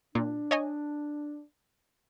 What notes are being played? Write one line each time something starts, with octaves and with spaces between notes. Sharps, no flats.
A#2 D4
C#5 D#5 G#5